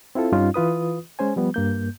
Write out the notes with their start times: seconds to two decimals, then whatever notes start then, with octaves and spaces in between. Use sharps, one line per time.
0.15 C4 E4 F4 A4
0.32 G2 G3 C#4 D#4 F4
0.54 E3 F4 B4 D#6
1.19 G#3 C#4 C5 G#5
1.36 F3 G3 B3
1.54 G2 A#3 G6